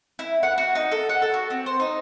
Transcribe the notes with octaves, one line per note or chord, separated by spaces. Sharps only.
E4
F#5
F#4
D#4
A4
F#5
A4
F#4
C4
C5
D#4